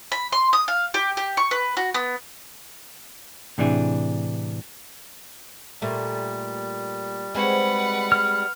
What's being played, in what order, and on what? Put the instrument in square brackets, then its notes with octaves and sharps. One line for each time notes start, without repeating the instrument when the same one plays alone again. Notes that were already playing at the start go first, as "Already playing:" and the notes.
[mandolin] B5
C6
D#6
F5
G4
G4
C#6
B4
F#4
B3
[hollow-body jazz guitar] A2 C3 E3 D4 G#4
[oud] A#2 A3 [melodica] G3
[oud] G#3 C4 F#4 [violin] B4 F#5
[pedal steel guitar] F6